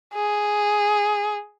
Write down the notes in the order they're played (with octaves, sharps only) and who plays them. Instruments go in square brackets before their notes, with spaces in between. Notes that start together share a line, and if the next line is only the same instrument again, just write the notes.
[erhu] G#4